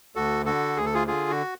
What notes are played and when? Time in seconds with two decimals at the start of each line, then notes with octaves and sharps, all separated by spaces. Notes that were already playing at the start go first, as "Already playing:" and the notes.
0.16 D2 F#4 A4
0.46 D3 F#4 A4
0.77 D2 G#4
0.86 A4
0.94 F4 G#4
1.07 D3 F4 G#4
1.30 F#4